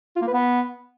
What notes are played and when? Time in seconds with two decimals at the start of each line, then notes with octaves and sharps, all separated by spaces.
0.16 F4
0.22 A#3
0.28 B4
0.33 B3